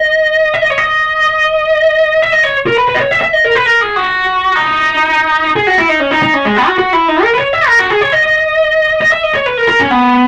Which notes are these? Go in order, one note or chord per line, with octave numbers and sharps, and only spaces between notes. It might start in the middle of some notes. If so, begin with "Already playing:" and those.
Already playing: D#5
E5
D#5
C#5
D#5
E5
D#5
C#5
A#4
B4
B4
D#5
C#5
E5
E5
D#5
A#4
B4
A#4
G#4
F#4
D#4
G#4
F#4
E4
D#4
C#4
D#4
D#4
C#4
G#3
B3
F#4
F#4
E4
D#4
A#4
B4
C#5
E5
A#4
F#4
G#4
C#5
D#5
D#5
E5
D#5
C#5
B4
A#4
A#4
C#4
B3